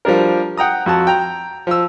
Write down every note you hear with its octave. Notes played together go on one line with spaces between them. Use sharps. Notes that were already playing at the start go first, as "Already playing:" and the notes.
F3 G3 D4 A#4
F#5 G5 A#5 D#6
F2 F#4 A5
G5 A#5
F3 E6